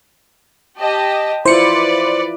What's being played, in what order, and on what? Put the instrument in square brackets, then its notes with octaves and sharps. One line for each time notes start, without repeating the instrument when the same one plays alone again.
[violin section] G4 D#5 A5
[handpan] E4 F4 [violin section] B4 D5 [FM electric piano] C5 C#7